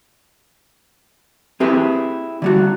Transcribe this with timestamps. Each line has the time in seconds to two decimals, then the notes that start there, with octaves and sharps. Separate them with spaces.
1.60 C4 E4 G4 G#4 B4
2.42 D3 G3 F#4